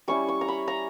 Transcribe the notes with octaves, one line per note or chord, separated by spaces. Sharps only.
G3 C#4 E4 C#6
C#6
A#5
B5
A#5